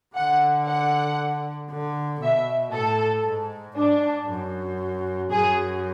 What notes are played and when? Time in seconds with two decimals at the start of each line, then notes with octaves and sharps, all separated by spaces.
0.16 D3 F#5
0.67 F#5
1.70 D3
2.21 B2 E5
2.73 A2 A4
3.25 G#2
3.77 G#2 D4
4.29 F#2
5.31 F#2 G#4